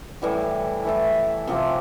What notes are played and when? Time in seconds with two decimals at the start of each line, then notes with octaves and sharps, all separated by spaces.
0.22 A2 E3 G3
0.85 E3 A3 E4
1.47 C3 F3 C4 G4